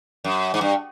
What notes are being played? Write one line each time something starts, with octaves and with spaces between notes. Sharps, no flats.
F#2
G#2
G2